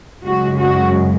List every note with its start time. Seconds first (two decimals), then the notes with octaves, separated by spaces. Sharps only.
0.24 F#2 C#3 G#3 F#4
0.57 F#4